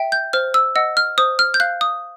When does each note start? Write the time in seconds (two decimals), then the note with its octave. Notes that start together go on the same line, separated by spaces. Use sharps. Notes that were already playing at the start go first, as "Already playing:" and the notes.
Already playing: E5 G5
0.12 G6
0.33 C5 F6
0.54 E6
0.76 D#5 F#5 E6
0.97 F6
1.18 C5 D#6
1.39 F6
1.54 G6
1.60 F5 F#6
1.81 D#6